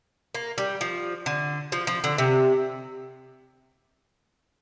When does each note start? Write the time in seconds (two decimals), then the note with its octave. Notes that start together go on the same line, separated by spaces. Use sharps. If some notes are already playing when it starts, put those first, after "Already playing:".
0.35 A#3
0.58 G3
0.81 F3
1.26 D3
1.72 F3
1.87 F3
2.04 D3
2.18 C3